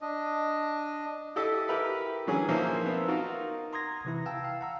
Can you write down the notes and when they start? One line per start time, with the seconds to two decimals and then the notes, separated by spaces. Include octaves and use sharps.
0.01 D4 D#5
1.36 E4 G4 A4 D#5 E5
1.68 E4 G4 A#4 B4 E5
2.26 D3 E3 F#3 C#4 G#4
2.48 F3 A#3 D#4 C5 E5
2.86 B3 C4 E5
3.08 D#4 F4 F#4 A#4
3.73 A#5 C6 D#6 G#6 A#6
4.05 C3 E3 E4
4.26 F5 G5 A5 E6
4.44 F5
4.61 F#5 A#5 E6